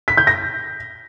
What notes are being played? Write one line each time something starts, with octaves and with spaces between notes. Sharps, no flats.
B6
G6
A#6